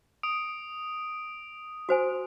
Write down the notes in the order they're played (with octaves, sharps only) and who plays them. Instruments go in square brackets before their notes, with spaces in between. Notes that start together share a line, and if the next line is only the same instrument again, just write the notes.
[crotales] D#6 D7
[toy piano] F#4 C5 G#5